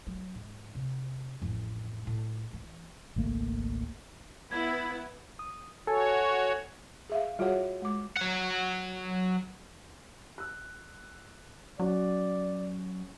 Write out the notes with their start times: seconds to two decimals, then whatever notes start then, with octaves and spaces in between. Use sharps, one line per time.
0.07 F#3
0.35 G#2
0.75 C3
1.42 A1 F2
2.07 A2
2.53 E3
3.16 G#1 C#2 A3 A#3
4.52 B3 E4 B5 G#6
5.39 D#6
5.87 F#4 A4 C#5 G#5
7.10 G#4 E5 F5
7.39 G3 F4 F#4 G#4 C#5 F#5
7.82 G#3 D6
8.17 F#3 F#5
10.38 E6 F#6
11.79 F#3 C#4 F#4 D5